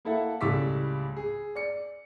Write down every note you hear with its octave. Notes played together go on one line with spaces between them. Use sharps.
A#3 E4 A4 E5 F#5
C#2 A2 G3 D6 E6 B6
G#4
D5 C#7